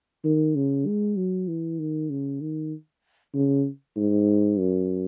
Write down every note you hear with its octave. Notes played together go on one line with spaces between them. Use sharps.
D#3
C#3
G#3
F#3
E3
D#3
C#3
D#3
C#3
G#2
F#2